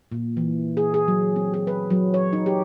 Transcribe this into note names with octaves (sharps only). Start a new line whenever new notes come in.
A#2
E3
G#4
G#4
F#3
C4
G#4
B4
F#3
C#5
D#4
G4